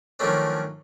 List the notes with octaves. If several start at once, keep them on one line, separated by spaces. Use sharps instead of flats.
D#3 F3 F#3 A3 C#4 D4